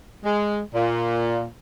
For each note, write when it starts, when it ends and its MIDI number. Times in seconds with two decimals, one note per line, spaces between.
0.24 0.61 56
0.74 1.46 46